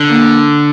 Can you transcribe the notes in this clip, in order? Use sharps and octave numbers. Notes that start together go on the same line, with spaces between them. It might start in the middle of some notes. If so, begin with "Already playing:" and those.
Already playing: D3
A#3